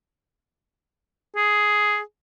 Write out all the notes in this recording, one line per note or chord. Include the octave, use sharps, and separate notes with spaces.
G#4